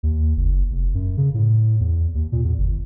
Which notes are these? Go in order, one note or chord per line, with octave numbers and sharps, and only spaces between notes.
D#2
F#1
F1
F#2
C#3
A2
E2
D#2
A#2
E2
G1